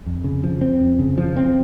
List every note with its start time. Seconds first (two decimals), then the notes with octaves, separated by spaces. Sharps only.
0.06 F2
0.24 C#3
0.43 F3
0.61 C4
0.80 F2
0.99 C#3
1.18 F3
1.36 C4